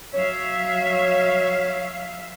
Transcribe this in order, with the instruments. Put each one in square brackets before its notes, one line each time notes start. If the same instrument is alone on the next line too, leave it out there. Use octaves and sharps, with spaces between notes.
[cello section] F#3 E5 F5 [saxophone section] C#5